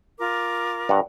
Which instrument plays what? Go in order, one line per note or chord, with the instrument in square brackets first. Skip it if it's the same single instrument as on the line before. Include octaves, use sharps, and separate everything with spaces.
[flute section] F4 A#4 D6
[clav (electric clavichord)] G2 F#5